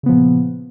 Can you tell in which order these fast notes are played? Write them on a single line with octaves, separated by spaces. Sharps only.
C#3 B3 F3 A#2